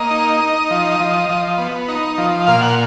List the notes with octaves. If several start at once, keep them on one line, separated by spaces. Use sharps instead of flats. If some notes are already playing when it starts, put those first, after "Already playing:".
Already playing: A#3 D#5
D#4
D#4
F3
F3
F3
B3
D#4
F3
A#2 F5
F#5